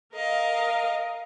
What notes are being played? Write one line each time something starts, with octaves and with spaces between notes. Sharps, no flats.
A#4 D#5 F5